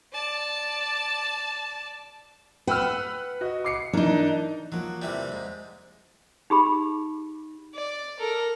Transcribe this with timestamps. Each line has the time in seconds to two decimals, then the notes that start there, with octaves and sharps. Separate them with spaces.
0.13 D5 A5
2.67 B4 F#5 G5 E6 F6
3.41 F#4 D#5
3.64 D6 C7 C#7
3.93 E3 D4 D#4 A#4
4.72 F3 F#3 A#3
5.02 C3 E3 G3
5.32 G#2
6.50 D#4 G4 G#4 B5
7.75 D5
8.19 A4 A#4